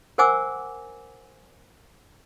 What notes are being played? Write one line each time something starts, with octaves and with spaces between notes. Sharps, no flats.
A#4 C5 F#5 G#5 D6 E6